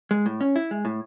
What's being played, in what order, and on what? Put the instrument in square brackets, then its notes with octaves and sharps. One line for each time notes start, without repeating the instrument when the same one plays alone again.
[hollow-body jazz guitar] G#3
A2
C#4
E4
G#3
A2